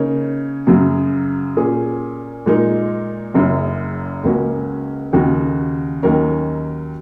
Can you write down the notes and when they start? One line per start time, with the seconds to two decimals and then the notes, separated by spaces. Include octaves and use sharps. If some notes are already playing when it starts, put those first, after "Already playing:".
Already playing: C#3 A#3 D#4 A#4 C#5
0.67 F#2 C#3 F#3
1.57 A#2 A#3 C#4 G#4
2.46 A#2 G#3 D#4 A#4
3.34 F#1 F#2 C#3
4.24 C#2 C#3 A#3 C#4 F#4
5.13 D#2 C#3 A#3 F#4 A#4
6.03 D#2 D#3 F#3 C#4 A#4